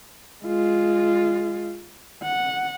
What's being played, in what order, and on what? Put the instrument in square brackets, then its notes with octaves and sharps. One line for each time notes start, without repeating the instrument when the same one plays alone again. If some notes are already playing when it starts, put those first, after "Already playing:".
[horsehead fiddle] G#3 F4
F#5